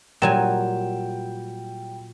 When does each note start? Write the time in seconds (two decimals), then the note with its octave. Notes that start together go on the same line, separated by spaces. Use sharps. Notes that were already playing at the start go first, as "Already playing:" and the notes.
0.22 A#2 F#3 G3 G5 G#5 E7